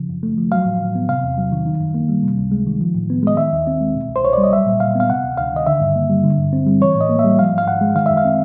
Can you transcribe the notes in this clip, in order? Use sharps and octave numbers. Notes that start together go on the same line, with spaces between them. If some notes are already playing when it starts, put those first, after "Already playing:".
Already playing: C#3 F3
F#2
A3
F3
F#3 F5
A2
A2
B3
C3 F5
E2
F#3
D#3
D#3
F#2
A#3
G3
C3
C#2
G#3
D#3
F3
A2
B3
G#3 D#5
D#3 E5
D#2
C4
G#3
B2
C2
C5
C2 C#5
D5
G3
D#5
F#3 E5
A#2
A#2 F5
B3 F5
C3 F#5
D2
D2 F5
D#3 D#5
D3 E5
G2
A#3
G3
D3
G2
C4
G3
E3 C#5
A2
D#5
A#3
E5
G3
F3 F5
G#2
F5
G#2 F#5
G#3
D#3 F5
F#2 E5
F5
C4